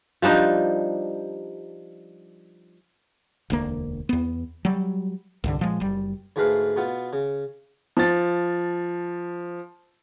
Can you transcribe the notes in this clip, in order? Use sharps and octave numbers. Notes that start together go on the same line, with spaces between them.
F3 G3 D4 D#4
E1 D2 A#3
E2 B3
F#3 G3
C2 G2 D3
A#2 F3 G#3
F#1 G3
D2 G#2 G#3 A3 B4 F5
B2 B3 F4
C#3
F3 A6